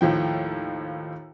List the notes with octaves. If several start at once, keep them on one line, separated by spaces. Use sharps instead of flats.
D#2 A2 F3 G5